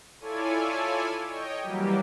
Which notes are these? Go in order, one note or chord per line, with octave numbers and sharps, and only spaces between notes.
E4 F4 A4 C#5 D5 G#5
C#5 D#5 G5
E3 F#3 G3 A#3 G4